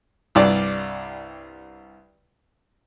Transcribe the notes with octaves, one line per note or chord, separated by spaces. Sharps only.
C2 G2 D5